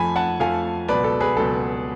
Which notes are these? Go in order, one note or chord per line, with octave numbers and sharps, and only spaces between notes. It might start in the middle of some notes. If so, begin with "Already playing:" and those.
Already playing: F2 F3 A3 G#5 B5
F#5 A5
F2 F3 A3 F5 G#5
C#2 B2 F#3 B4 D5
A4
G#4 B4
C#2 B2 F#3 A4